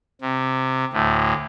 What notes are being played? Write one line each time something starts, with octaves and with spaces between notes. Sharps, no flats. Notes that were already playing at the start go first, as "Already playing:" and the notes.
C3
D2 A2